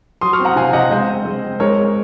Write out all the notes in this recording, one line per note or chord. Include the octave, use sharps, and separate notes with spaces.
F#3 C6 D#6
C#6 F6
C4
F#5 A#5
C3 F5 G#5
C3 D#5 F#5
G#3 C5 D#5
C4
G#3
C4
G#3 A#4 C#5
G#3